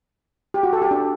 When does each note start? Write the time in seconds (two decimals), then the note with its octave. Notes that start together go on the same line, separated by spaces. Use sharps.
0.54 G4
0.63 F#4
0.73 A4
0.82 G4
0.91 D4